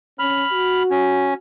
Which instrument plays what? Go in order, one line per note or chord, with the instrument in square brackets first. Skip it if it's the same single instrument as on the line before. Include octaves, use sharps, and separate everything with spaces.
[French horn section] C#4 [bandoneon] B5 F6
[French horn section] F#4
[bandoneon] C#4